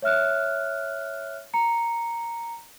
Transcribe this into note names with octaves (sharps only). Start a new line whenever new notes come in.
C#5 E5 F6 F#6
A#5 C#7